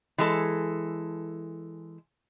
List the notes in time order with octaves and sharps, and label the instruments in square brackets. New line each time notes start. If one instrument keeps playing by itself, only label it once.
[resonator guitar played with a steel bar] E3 G#3 A4